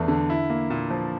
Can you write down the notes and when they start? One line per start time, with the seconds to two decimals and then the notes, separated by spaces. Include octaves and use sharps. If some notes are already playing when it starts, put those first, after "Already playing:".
Already playing: E2 A3 D4
0.08 D3
0.30 E4
0.50 A#3
0.70 A#2
0.90 F3